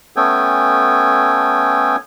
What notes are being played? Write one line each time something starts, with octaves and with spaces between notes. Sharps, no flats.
A3 B3 C#4 A4 G5 G#5